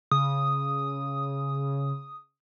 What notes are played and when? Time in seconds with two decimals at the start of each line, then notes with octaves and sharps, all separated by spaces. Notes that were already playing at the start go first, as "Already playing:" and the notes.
0.11 C#3 D#6